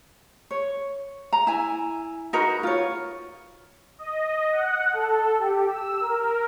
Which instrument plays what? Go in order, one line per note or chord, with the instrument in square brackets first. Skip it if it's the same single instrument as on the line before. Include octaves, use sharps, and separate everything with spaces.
[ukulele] C#5
A#5
E4 G#5
D#4 F#4 A#4 B4
F4 C#5
[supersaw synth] D#5
F#5
A4
G4
E6
A#4